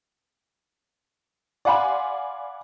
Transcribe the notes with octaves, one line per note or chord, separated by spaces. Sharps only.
D5 F5 F#5 G#5 B5 C6